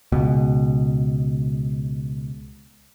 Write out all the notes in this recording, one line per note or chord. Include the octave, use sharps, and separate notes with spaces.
C#2 B2